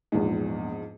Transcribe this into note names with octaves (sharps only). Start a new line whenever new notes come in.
A#1 E2 G#2 F3